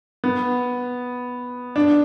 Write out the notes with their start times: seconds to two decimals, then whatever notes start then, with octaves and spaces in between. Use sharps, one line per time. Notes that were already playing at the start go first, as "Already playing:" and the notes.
0.24 B3
1.76 D4